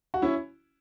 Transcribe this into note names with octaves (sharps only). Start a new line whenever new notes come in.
F#4
C#4 E4